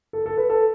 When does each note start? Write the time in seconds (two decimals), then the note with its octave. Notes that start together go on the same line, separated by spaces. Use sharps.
0.13 A4
0.26 A4
0.37 B4
0.50 A4